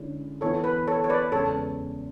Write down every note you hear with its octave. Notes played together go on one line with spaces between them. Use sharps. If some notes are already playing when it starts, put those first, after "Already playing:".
Already playing: D3 G#3 C#4 E4
E3 B3 E4 A4 C#5
B4
A4 C#5
C#5
B4 D5
E2 C#3 G#3 A4 C#5